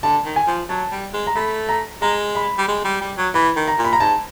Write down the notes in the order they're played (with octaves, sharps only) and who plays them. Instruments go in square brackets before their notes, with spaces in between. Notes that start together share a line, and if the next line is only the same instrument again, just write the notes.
[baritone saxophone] D3 [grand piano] A5
[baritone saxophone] D#3
[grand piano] G#5
[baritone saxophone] F3
[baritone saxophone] F#3 [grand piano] A5
[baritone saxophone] G3
G#3
[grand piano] A#5
[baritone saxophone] A3 [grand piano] B5
[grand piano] A#5
[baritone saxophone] G#3 [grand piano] A#5
[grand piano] B5
[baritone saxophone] G3
G#3
G3
G3
F#3
[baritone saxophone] E3 [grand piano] B5
[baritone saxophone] D#3
[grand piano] A#5
[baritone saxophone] A#2
[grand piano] B5
A#5
[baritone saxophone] G#2 [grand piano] A5